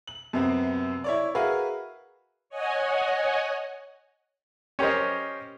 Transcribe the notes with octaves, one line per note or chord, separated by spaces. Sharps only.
F#7
F#2 C3 B3 C4
E4 C#5 D5
F#4 G#4 A#4 B4 E5 F5
C#5 D#5 F#5 G#5
C#4 G4 A#4 C5 D#5